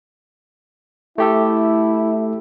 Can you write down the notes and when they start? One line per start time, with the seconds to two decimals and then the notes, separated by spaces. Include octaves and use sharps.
1.18 A3 E4 G4 A4